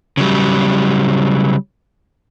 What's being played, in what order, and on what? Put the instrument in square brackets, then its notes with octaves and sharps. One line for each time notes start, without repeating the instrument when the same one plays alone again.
[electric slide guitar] C#3 F#3 G3